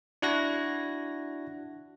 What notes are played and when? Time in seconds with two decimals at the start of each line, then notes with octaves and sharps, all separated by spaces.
0.22 D4 E4 F#4 F#6 G#6 A#6